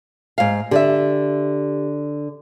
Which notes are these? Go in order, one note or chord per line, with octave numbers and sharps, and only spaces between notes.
G#2 F5
D3 G4 D5 E5